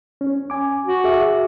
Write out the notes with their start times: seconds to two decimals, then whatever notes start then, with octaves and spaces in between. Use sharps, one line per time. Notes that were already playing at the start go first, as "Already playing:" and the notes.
0.21 C#4
0.50 G#5 D6
0.86 F#4
1.04 G#4 E5 D6